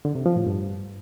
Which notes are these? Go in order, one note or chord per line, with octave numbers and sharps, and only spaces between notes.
D3
C3
F3
A2
G2